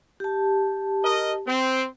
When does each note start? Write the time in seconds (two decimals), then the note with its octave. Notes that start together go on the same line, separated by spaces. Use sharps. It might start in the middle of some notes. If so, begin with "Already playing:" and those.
0.20 G4 A5
1.04 A#4 D#5
1.47 C4